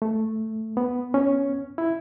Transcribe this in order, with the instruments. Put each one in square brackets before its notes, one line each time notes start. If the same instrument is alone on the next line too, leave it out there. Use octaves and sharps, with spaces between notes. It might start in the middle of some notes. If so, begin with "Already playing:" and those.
[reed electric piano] A3
B3
C#4
E4